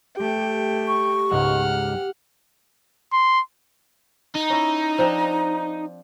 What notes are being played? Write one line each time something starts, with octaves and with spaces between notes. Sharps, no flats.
A3 G4 G5
C#6
C#2 G#2 G#3 F#5 F6
C6
D#4 A#5
C#4 E4
F3 C4 D4